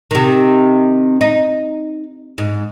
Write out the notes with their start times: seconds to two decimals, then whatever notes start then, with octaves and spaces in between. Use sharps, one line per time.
0.11 C3 D#3
1.21 D#4
2.38 G#2